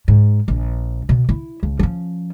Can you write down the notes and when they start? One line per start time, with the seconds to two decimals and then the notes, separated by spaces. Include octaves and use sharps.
0.08 G#2
0.48 A#1
1.09 B2
1.29 E4
1.63 C#2
1.79 F3 C#4